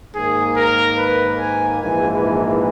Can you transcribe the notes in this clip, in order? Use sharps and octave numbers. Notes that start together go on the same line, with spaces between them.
G#2 D#3 A#3 G#4
A#4
B4
G#5
A#1 G#2 E3 A#3 G#5